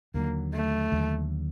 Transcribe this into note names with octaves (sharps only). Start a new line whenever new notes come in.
D#2 D3 F#3 A#3
A3
D#2 D3 F#3